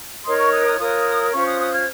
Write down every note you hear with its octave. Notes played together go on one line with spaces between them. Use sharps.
D#4 A#4 C#5 C6 D#6
C#6 F6
D#6 F#6
D#6 F#6
F4 A#4 C#5 D#6 F#6
C#4 F4 C5 C#6 F6
D#6 F#6
D#6 F#6
F6 G#6